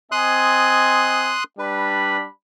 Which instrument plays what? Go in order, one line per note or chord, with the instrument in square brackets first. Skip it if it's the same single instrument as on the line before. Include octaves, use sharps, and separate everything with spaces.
[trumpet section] C4 D#5 G#5 [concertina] C6 D#6 F#6
[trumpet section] G3 D4 B5 [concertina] B4